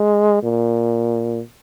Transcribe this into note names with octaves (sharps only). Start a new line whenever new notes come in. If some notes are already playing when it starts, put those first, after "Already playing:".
Already playing: G#3
A#2